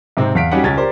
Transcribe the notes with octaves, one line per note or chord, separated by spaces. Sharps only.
G#2 C3 C4
E2 F5 B6 D7
G3 C#4 D#4 F#4 G4 F#5
C#2 C#4 G#6 A6
G4 A#4 C5 D5